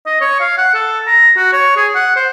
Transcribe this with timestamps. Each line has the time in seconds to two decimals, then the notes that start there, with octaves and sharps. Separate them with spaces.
0.06 D#5
0.21 C#5
0.40 F5
0.58 F#5
0.74 A4
1.07 A#5
1.37 F#4
1.53 C#5
1.76 G#4
1.95 F#5
2.16 C5